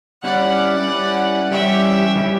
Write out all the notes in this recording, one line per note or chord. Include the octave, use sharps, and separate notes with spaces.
G3 C#4 E4 B4 D5 F#5
G3 C#4 E4 B4
E3 G3 C#4 G4 C#5 E5 G5
E3 G3 C#4 G4 C#5